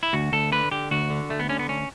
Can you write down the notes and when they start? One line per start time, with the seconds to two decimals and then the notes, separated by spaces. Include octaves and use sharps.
0.03 E4
0.13 D2 F#4
0.32 D2 A4
0.52 D3 B4
0.71 D3 G4
0.91 D2 F#4
1.10 D3
1.30 D2 A3
1.39 B3
1.49 D3 C#4
1.59 B3
1.69 D2 C#4